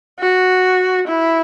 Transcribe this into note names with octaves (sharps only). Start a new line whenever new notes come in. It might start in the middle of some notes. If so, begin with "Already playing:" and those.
F#4
E4